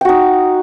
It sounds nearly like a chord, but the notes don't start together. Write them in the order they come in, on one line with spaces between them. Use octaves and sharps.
G5 F#4 D#4